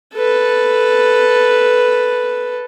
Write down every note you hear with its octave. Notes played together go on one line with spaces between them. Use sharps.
A4 B4